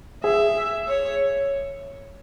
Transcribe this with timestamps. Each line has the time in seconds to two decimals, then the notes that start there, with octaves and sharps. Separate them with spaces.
0.24 G#4 E5
0.88 C#5